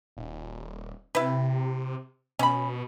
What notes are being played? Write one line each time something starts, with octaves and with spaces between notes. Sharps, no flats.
D#1
C3 E4 B4
B2 C#4 B5